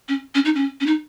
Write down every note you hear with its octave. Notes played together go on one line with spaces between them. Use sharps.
C#4
C#4
D#4
C#4
C#4
D#4